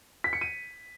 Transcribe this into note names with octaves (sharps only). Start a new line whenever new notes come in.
B6
C#7
D#7